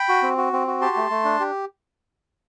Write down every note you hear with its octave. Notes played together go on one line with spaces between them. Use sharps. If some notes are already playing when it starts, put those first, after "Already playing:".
Already playing: G5 B5
F#4
C4
F#4
C4
F#4
G4 A5 C6
A3
A3
D4
G4